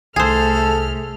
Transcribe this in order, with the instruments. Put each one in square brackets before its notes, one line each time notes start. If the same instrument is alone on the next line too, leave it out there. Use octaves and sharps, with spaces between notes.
[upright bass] C2 [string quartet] A3 F6 [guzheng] G#4 C5 [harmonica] A4